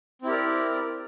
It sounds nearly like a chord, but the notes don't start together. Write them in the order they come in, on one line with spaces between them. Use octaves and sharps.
C4 E4 G4 A#4 D5